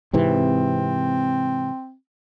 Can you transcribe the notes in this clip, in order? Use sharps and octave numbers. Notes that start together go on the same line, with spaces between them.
G#2 C3 E3 C4